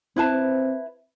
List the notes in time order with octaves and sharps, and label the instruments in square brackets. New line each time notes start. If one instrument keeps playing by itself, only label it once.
[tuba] C4 [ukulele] E4 B4 A5